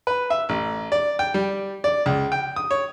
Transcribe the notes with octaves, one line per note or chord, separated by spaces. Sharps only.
B4
E5
A1
D5
G5
G3
D5
C#2
G5
D#6
C#5